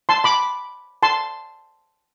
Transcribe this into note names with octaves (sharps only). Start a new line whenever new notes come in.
A5 C6
B5 D6
A5 C6